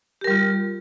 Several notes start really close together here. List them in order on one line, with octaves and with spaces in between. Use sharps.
G4 A#4 G3 F4